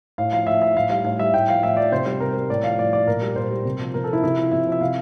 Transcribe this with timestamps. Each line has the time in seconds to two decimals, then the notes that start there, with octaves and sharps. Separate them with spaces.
0.18 A2 F5
0.32 F3 F5
0.47 A2 E5
0.61 F3 E5
0.76 A2 F5
0.90 G3 F5
1.04 A2 F5
1.19 G3 E5
1.33 A2 G5
1.48 F3 F5
1.63 A2 E5
1.77 F3 D5
1.92 C3 C5
2.06 G3 C5
2.20 C3 A#4
2.36 G3
2.50 A2 D5
2.64 F3 F5
2.79 A2 D5
2.93 F3 D5
3.07 A#2 A#4
3.21 G3
3.36 A#2 C5
3.50 G3
3.65 C3
3.80 F3
3.94 C3 A#4
4.04 A4
4.09 F3 E4
4.23 C3 E4
4.38 F3
4.52 C3 E5
4.67 F3
4.72 E5
4.81 C3 F5